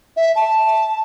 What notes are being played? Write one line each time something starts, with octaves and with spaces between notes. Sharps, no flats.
E5
A5